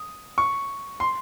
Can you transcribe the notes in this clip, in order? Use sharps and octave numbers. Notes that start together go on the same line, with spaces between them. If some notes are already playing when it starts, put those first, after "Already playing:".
Already playing: D#6
C#6
C6